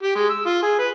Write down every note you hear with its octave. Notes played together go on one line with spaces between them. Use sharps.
G4
G#3
E6
F4
G#4
B4